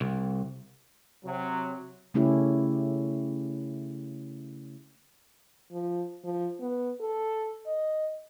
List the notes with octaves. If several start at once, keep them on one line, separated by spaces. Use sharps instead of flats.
C2
C3 F#3
C#3 A3 C#4 E4 G4
F3
F3
B3
A4
D#5